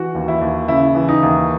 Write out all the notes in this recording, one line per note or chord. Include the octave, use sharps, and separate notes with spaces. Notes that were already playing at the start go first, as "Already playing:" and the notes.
Already playing: E3 F#4
D#2
E4
D#2
C#3 E4
E3
D#4
D#2